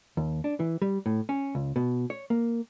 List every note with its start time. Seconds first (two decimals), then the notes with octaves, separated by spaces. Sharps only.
0.17 D#2
0.44 D4
0.60 E3
0.82 G3
1.06 A2
1.29 C#4
1.55 C#2
1.76 B2
2.10 C#5
2.30 A#3